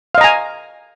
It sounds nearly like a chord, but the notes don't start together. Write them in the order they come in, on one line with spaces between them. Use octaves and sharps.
F5 D#5 A#5 G#5